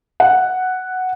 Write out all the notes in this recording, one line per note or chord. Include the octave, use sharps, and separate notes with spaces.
F#5